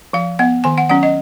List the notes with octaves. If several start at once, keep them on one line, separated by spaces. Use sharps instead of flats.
F3 F5
B3 F#5
D#3 G#5
F#5
F#3 C#4 F#5
D#5